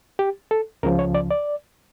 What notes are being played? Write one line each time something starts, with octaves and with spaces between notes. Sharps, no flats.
G4
A4
C#2 C#3 F3 A#4
C#5
D5
D5